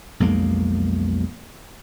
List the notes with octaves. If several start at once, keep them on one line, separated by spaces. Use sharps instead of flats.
B1 F2 G#3 A#3